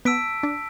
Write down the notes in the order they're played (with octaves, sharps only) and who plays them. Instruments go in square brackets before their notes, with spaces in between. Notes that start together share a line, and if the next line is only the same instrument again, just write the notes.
[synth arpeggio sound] B3 [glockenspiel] A5 E6 B6 D7
[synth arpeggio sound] D4